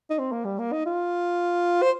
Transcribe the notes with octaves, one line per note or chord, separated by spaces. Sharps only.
D#4
C4
A#3
G3
A#3
D#4
F4
C5